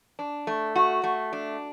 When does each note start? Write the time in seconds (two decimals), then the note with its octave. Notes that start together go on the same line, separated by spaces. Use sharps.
0.19 D4
0.47 A3
0.75 F#4
1.04 A3
1.33 D4